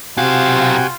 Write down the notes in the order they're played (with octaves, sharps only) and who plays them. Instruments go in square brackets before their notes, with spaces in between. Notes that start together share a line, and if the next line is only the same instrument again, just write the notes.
[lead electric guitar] B1 F5 [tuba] C3 [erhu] F4 [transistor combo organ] F#4 G5 G#5